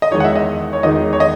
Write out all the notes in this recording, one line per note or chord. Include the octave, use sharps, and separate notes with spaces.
D#5
E2 D#3 G#3 D#4 C#5
F#5
E5
D#5
C#5
E2 D#3 G#3 D#4 D#5
C#5
D#5